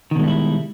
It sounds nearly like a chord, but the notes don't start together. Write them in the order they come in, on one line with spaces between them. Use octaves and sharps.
D#3 B2 G#3 G3 E4